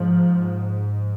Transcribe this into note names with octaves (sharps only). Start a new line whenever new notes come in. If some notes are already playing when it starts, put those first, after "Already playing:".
Already playing: G#2 F3